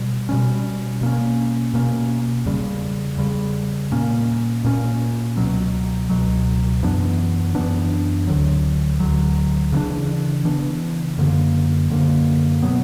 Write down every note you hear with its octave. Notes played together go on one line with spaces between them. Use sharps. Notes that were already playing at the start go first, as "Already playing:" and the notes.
Already playing: B2 G3
B2 G3 C#4
B2 A#3 C#4
B2 A#3 C#4
E2 C#3 G3
E2 C#3 G3
A#2 A#3 C#4
A#2 A#3 C#4
C#2 B2 F#3
C#2 B2 F#3
F#2 E3 B3 D4
F#2 E3 B3 D4
D2 D3 F#3
D2 D3 F#3
C#3 E3 B3 D4
C#3 E3 B3 D4
F#2 D3 A#3
F#2 D3 A#3
B2 F#3 B3